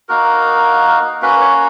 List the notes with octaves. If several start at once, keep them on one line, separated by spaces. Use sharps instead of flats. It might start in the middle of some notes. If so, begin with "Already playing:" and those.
A#3 D#4 F#4 A#4
A#3 C#4 F#4 B4
C#5